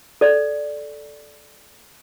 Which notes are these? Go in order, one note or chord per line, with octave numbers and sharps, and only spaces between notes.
A4 D5